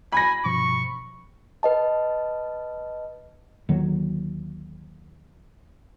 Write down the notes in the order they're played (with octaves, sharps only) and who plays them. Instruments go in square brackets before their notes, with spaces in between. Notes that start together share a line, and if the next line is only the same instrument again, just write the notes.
[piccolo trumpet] G#5 [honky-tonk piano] B5 A#6
[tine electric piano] G2 B2 F3 [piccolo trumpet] C#6
[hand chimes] B4 D#5 A5
[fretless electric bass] D#2 D3 D#3 F#3